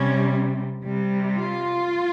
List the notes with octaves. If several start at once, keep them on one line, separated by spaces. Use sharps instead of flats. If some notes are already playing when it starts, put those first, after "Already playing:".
Already playing: C3 G3 C#4
C3 G3
F4